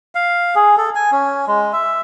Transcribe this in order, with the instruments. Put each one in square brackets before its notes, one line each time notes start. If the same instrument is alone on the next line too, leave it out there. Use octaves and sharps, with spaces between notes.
[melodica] F5
G#4
A4
G#5
C#4
G#3
E5